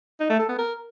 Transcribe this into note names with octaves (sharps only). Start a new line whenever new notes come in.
D#4
A3
A4
B3
A#4